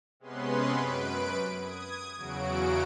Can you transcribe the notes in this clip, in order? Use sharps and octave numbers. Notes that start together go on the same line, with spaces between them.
C3 G#3 B3 C#4 B4 C6
F#2 B4 D7
D#6 G#6
E2 C#3 F#3 F#4 D7